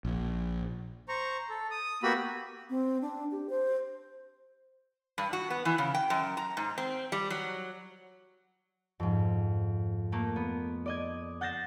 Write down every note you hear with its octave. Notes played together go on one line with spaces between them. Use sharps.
A#1
C5 A#5 C#6
A4
D#6
A#3 B3 F#4 G4 B5 E6
C4
D4
G4
C5
G2
F#4
B3
E3
C#3
G5
F#2
A#5
G#2
C4
G3
F#3
F2 G#2
A3 A#3
B3
D5 D#5 G#6
F#5 G6 A6 A#6 C7 E7